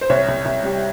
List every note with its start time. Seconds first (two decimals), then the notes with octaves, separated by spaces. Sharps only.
0.01 C5
0.09 C2 C#5
0.28 C2
0.45 C2
0.63 G3